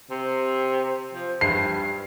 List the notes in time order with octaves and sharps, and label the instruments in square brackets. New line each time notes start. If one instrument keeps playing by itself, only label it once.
[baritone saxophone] C3
F3
[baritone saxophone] G2 [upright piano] C7